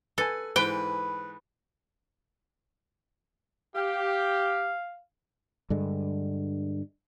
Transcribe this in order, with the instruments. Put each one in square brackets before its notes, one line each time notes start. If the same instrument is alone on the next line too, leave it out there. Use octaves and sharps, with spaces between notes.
[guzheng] A4 [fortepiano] B4 G#5
[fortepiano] G#2 E3 [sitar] B4 [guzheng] G5
[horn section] G4 [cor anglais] F5
[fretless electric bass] G2 D3 G#3